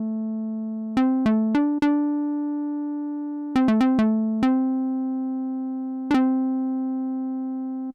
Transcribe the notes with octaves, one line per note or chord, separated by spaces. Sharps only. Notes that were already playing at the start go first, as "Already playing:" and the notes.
Already playing: A3
C4
A3
D4
D4
C4
A3
C4
A3
C4
D4
C4